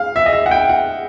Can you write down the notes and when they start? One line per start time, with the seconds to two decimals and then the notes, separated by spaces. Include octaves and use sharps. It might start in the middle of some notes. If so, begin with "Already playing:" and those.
Already playing: F5
0.16 E5
0.26 D#5
0.33 E5
0.46 F#5
0.51 G5
0.69 F#5